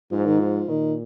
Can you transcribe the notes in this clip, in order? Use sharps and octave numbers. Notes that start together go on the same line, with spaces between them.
G#2 F3
D#3
F3
A#2 D#3